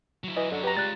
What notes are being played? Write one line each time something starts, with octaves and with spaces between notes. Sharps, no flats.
F#3 E4
E3 D#5
F#2 D3 F#4
G4 B4 A#5
G3 G#3 F4 F#6 A6